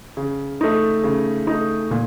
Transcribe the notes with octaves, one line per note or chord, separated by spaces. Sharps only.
C#3
A3 D#4
C#3
A3 D#4
A#2